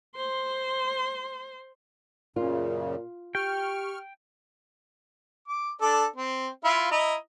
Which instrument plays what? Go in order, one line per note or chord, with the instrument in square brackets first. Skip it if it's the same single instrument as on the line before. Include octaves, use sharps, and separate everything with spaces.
[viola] C5 C6
[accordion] F#2 C#3 [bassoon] A#2 [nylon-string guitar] F4
[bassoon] G4 [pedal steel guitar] G5 [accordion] C#6 F6
[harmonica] D6
D4 A4 D5
C4
E4 F4 F5
E4 D#5 A#5